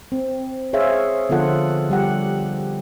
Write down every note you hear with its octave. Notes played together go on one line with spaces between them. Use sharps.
C4
G#4 C5 C#5 E5 F5
D3 F3 B3 F4 A4 F#5
G3 G4 F#5